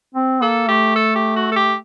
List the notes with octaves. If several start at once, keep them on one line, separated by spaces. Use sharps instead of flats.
C4
A#3 A4
A3 G4
A4
G4
F#4
A4
G4